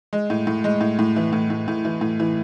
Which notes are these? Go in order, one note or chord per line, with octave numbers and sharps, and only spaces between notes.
G#3
A2
A2
G#3
A2
A2
E3
A2
A2
A2
E3
A2
E3